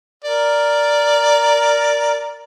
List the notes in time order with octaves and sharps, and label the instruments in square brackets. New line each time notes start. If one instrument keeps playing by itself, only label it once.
[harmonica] A#4 D5